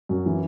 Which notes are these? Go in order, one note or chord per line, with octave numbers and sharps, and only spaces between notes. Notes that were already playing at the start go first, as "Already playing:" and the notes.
F#2
E3